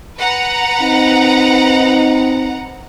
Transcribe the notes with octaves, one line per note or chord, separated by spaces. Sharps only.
B4 F#5 A#5
C4 D#4